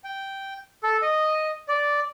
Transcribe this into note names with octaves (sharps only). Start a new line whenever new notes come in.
G5
A4
D#5
D5